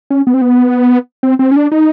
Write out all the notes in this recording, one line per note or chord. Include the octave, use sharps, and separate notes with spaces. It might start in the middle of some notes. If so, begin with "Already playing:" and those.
C#4
B3
C4
B3
C4
C4
C#4
D4
D#4